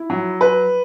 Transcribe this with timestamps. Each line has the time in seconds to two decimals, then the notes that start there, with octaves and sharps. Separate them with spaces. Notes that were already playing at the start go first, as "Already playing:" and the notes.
Already playing: E4
0.10 F#3
0.41 B4